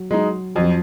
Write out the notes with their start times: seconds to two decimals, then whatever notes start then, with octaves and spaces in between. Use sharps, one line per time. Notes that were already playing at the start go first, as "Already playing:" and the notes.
Already playing: F#3
0.11 F#3 G#3 D#4
0.55 F2 F#3
0.64 F3